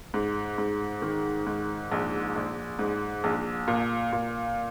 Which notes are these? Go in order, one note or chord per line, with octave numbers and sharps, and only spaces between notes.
G#2
G#2
D#3
G#2
A#1
A#1
G#2
A#1
A#2
A#2